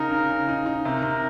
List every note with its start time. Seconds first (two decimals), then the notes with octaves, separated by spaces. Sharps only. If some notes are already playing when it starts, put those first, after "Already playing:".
Already playing: C#3 D#4 A#4
0.11 C#3
0.30 C#3
0.49 D#4
0.66 D#4
0.84 C3 A#4
1.03 C3